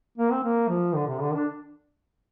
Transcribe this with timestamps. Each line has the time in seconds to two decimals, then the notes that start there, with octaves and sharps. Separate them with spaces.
0.18 A#3
0.32 C4
0.44 A#3
0.69 F3
0.95 D3
1.08 C3
1.21 D3
1.34 D4